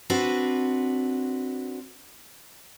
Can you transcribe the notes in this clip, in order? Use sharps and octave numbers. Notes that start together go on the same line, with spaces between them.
C4 D4 F#4 B4